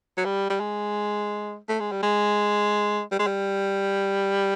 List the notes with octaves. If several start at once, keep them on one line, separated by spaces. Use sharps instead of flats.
F#3
G3
G3
G#3
A3
G#3
G3
G#3
G3
G#3
G3